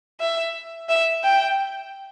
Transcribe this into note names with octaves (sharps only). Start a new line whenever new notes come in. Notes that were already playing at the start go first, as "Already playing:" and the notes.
E5
E5
G5